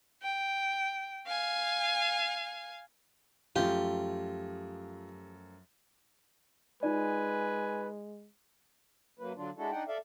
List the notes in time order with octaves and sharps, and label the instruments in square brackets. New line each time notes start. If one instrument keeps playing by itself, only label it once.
[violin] G5
F5 G#5
[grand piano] F#2 F3 A3 [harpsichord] F4 [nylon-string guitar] G4
[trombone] G#3 [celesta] D#4 F4 D5 [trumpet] B4 [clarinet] G#5
[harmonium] F#2 F#3 A#3 B4
D3 F#3 D4 F4
G#3 D4 E4 F#4 A4
D4 D#4 F#5 G5
A4 D5 E5 F5